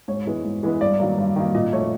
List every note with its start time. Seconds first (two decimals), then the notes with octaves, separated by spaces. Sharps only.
0.08 G#2 C#5
0.26 E3 G#3 B3
0.45 G#2
0.63 E3 G#3 B3
0.81 G2 D5
1.00 D#3 F#3 A#3
1.18 G2
1.36 D#3 F#3 A#3
1.55 A#2 D#5
1.73 F3 A3 C#5